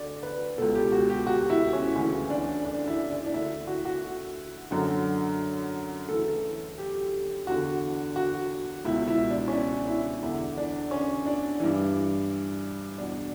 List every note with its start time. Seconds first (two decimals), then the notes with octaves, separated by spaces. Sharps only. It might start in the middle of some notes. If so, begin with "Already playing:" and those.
Already playing: D2 D3 D5
0.23 B4
0.58 C#2 B2 A4
0.75 G4
0.92 F#4
1.09 G4
1.27 F#4
1.50 E4
1.73 C#4
1.96 D2 C#3 E3 C#4
2.30 D4
2.65 D4
2.88 E4
3.11 D4
3.26 D4
3.34 D2 D3 E4
3.67 F#4
3.85 F#4
4.71 F#2 D3
6.09 D2 C#3 E3 A4
6.78 G4
7.47 E2 D3 F#4
8.16 F#4
8.84 C#2 B2 E4
9.08 E4
9.30 D4
9.48 C#4
9.53 D4
9.88 E4
10.23 E2 D3 E4
10.57 D4
10.91 C#4
11.26 D4
11.60 G2 E3
12.98 E2 B2 D4